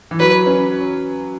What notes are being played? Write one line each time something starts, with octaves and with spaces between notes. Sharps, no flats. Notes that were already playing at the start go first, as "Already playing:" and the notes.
E3
F#3 B4
C#4